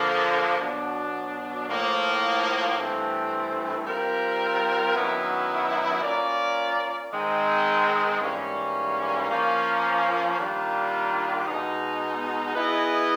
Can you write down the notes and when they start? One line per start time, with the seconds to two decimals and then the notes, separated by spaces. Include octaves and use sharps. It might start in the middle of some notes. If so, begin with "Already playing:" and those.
Already playing: D3 F3 A#3
0.60 B2 F#3 B3 D4
1.69 A2 F3 A#3
2.77 G2 E3 A3 C4
3.86 G3 C4 F4 A#4
4.95 F#2 D#3 F#3 B3 E4
6.03 A#3 C#4 F4 A#4 D5
7.13 D#3 G#3 C4
8.21 G#2 E3 G3 A#3 C#4
9.30 F3 A#3 C#4
10.39 D#3 G3 A#3 D4 F4
11.47 B2 G#3 B3 D#4
12.55 B3 E4 G#4 B4 D#5